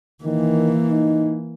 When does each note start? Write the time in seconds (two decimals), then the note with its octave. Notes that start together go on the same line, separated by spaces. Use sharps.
0.24 D#3 E3 A#3
0.89 D#4